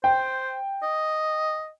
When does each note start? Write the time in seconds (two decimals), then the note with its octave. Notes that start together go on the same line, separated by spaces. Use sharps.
0.04 C5 G5
0.83 D#5